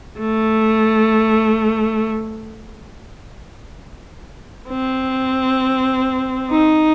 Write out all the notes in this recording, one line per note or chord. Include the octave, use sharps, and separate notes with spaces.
A3
C4
D#4